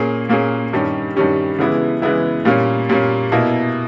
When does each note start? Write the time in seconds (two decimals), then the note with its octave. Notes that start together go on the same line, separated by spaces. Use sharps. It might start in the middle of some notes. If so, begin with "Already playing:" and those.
Already playing: A#2 A#3 C#4 G#4
0.29 A#2 A#3 C#4 G#4
0.73 G2 D#3 G3 C#4 G4
1.16 G2 D#3 G3 C#4 G4
1.59 C#3 E3 G#3 B3 E4
2.02 C#3 E3 G#3 B3 E4
2.45 A#2 G3 A#3 C#4
2.89 A#2 G3 A#3 C#4
3.32 B2 A#3 E4